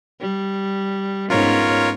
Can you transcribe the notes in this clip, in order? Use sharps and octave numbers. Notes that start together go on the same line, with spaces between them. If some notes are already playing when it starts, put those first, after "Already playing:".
G3
G#2 B3 C#4 F4 A#4 C#5